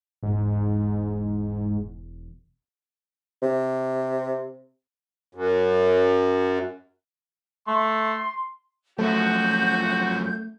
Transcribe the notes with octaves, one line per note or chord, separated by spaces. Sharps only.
E1 G#2
C3
F#2
A3 C6
F#2 F3 A3 F#4 G6